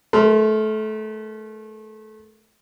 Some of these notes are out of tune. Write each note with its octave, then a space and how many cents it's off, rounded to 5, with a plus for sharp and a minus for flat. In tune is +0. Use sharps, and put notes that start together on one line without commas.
A3 -25 A#4 +0 C6 +0